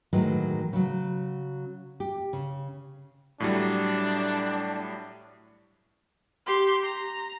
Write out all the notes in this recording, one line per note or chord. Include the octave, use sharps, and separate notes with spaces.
A2 D#3 E3 F#3 G#3
C#3 F#3
G4
C#3
A2 F#3 G3 D4
G4 C6
A#5